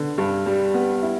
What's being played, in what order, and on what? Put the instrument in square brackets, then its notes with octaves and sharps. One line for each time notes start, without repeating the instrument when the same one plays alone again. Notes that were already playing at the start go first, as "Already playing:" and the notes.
Already playing: [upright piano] D3 B3
G2
G3
B3
E4